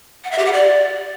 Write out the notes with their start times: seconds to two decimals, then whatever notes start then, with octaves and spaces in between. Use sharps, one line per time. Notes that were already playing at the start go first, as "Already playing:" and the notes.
0.24 F#5
0.31 E5
0.38 G4
0.45 F#5
0.53 D5